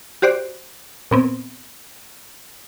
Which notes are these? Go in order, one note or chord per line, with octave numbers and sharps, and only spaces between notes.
F#4 G4 C5 D5 F#6
A#2 B3 C4